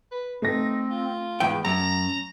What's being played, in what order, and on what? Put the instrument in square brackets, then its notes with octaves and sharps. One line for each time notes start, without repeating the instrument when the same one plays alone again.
[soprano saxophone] B4
[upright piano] A3 A#6 [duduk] C4 [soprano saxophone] D#4
[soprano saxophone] F4
[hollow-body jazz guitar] E2 G#2 G5 [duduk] B3
[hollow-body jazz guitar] F#2 [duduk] C#4 [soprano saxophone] A#5